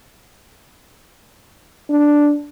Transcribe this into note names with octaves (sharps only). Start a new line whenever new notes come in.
D4